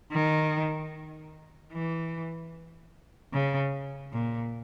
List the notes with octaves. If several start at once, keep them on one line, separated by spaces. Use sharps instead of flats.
D#3
E3
C#3
A#2